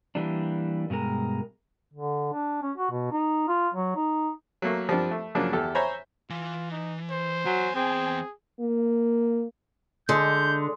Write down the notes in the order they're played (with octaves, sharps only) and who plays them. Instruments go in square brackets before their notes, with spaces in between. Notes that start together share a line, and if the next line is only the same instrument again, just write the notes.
[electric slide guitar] E3 G3 A#3 D4
G2 B2 G#3 A#4
[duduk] D3
D4
C#4
F#4
B2
D#4
F4
F#3
D#4
[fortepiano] F#3 A3 A#3
F3 G3 C4 D4
A3
C#3 F3 F#3 A#3 D4
E2 G4 A4
C5 C#5 E5 G#5 A#5 B5
[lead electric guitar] E3 [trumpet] F4
[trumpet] D#4
C5
[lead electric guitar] E2 G#5 [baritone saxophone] F#3
[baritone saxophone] C4 [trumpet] G#4
[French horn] A#3
[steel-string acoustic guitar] D3 [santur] G#3 [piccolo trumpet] G6